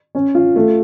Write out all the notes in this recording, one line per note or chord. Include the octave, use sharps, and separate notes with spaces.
C#4
F4
A3